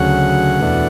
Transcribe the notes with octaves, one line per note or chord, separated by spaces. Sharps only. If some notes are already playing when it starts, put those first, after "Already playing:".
Already playing: D2 C#3 F#3 F#5
E2 B2 A3 D4